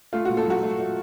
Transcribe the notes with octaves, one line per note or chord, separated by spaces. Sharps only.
A3 F4
F#4
A#2
A4
F#3 F#4
A3
A3